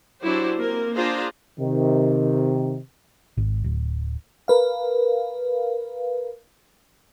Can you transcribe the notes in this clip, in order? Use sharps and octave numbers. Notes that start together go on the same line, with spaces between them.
F#3 D4 E4 F#4 G4 C5
A#3 C4 A#4
D4 F4 G#4 C5 A#5
C3 D#3
G#1
D1
A#4 B4 F5